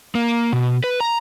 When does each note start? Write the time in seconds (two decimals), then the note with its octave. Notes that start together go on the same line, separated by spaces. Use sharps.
0.15 A#3
0.52 B2
0.84 B4
1.00 A#5